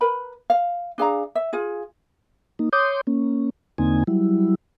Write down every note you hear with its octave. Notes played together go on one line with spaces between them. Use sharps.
A#4 B4 B5
F5
D4 G#4 F5 A#5
E5
F4 G#4
A#3 D#4
C#5 C6 D6 D#6 G6
A#3 C#4
E2 D3 A#3 C4 D#4 G#5
F#3 G3 E4